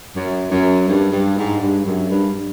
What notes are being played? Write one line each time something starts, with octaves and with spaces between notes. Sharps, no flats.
F#2
F#2
G2
G2
G#2
G2
F#2
G2